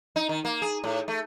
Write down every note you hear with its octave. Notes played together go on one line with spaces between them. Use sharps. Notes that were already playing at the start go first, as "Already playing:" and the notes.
D#4
D#3
A#3
G#4
A2
A3